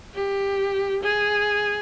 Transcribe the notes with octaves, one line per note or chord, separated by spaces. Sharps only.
G4
G#4